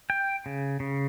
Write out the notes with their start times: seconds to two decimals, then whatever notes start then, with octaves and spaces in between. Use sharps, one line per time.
0.10 G5
0.46 C#3
0.80 C#3